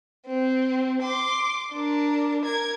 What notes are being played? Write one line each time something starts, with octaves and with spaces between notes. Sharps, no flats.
C4
C6 D6
D4 A#4
A#4 G#6